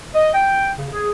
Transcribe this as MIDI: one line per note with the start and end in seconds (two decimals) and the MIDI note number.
0.15 0.32 75
0.34 0.70 79
0.78 0.88 49
0.93 1.12 68